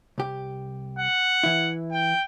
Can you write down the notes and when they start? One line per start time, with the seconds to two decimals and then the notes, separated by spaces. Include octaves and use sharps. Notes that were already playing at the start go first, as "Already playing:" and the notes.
0.18 C2 G4
0.99 F#5
1.43 E3 E4
1.92 G5